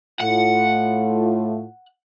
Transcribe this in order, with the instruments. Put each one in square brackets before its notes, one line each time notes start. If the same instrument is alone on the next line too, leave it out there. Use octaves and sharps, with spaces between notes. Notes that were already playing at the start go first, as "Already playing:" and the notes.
[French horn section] A2 A3 F4 [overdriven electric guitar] F#5